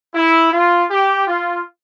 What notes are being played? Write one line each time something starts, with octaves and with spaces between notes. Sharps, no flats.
E4
F4
G4
F4